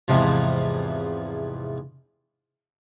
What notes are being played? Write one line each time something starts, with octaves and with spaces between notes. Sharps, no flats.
E2 G#2 C3 F3